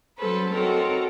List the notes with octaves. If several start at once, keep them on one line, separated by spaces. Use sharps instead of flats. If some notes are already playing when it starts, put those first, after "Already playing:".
F#3 C#4 A4 B4 C5
C4 D#4 F#4 A4 A#4 C#5